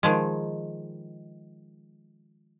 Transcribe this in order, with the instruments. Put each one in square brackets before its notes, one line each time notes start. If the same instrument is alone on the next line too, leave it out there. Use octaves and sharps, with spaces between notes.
[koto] D#3 F3 G#3